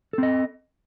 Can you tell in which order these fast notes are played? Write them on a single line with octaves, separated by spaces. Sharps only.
A4 C4 D#5